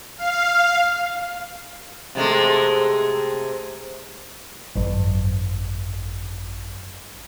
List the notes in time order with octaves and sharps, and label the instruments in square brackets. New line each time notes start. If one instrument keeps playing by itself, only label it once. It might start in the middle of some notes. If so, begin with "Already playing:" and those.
[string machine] F5
[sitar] C3 G#3 A3
[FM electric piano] G#1 F#2